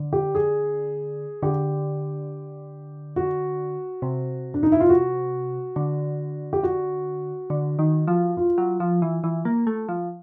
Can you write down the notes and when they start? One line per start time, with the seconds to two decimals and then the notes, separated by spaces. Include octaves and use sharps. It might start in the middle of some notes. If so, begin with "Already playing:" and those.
Already playing: D3
0.13 G4
0.35 G#4
1.42 D3 G4
3.16 F#4
4.02 C3
4.54 D4
4.63 D#4
4.72 E4
4.80 F4
4.89 F#4
5.76 D3
6.53 G4
6.63 F#4
7.50 D3
7.79 D#3
8.08 F3
8.37 F4
8.58 F#3
8.80 F3
9.02 E3
9.24 E3
9.45 A#3
9.67 A3
9.89 F3